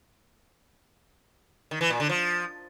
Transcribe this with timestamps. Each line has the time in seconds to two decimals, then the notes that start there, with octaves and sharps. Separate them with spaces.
1.71 D#3
1.81 E3
1.90 A#2
2.00 D3
2.09 F3